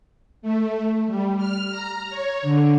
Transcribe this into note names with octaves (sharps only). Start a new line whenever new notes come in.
A3
G3
F6
A#5
C#5
D3